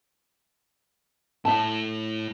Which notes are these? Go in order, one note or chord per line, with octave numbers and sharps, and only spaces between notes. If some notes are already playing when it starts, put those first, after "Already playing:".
A2 E4 E5 A5